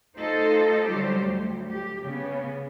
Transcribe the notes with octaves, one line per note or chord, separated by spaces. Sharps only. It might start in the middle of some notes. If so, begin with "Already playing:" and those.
A3 D#4 F4 A4 C5 D#5
D3 F#3 G3 G4 C5
D2
G4
C#3 B3